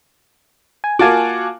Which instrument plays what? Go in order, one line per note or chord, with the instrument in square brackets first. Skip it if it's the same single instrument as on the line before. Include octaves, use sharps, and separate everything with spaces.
[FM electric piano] G#5
[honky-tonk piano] A#3 F4 F#4 [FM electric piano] G#5 A5 D6